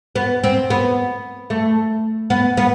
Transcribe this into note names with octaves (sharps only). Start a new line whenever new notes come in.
B3
C4
B3
A3
B3
B3